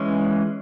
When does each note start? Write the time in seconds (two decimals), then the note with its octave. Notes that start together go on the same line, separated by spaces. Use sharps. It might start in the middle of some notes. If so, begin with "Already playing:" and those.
Already playing: E3 G#3 C#4